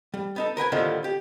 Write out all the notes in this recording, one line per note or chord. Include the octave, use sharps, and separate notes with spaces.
G3
B3 D#4 A4
A#4 B4 G5 G#5
A2 D3 D#3 F3 G3 A#3
G4